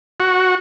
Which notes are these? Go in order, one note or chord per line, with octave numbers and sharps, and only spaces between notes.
F#4